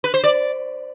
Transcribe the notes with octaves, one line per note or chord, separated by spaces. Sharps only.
B4
C5
D5